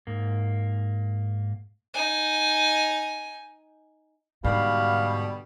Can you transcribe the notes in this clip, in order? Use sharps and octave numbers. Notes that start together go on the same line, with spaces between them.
G#2 A#3
D#4 G#5
G#2 B2 D3 G3 F5